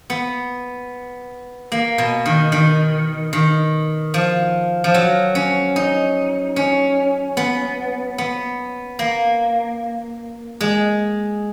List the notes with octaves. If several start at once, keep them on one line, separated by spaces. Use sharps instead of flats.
B3
A#3
B2
D#3
D#3
D#3
F3
F3
F#3
C#4
D#4
C#4
B3
B3
A#3
G#3